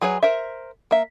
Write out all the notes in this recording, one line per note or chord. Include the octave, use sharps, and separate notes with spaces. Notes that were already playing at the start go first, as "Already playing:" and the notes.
F#3 G#4 B4 C#5
A#4 C5 E5
A#3 E5